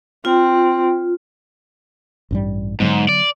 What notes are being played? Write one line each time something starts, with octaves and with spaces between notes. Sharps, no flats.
C4 F4
A1 G2 G3
G#2 D3 F#3 B3
D5